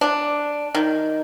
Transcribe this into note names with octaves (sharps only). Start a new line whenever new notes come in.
D4
D#3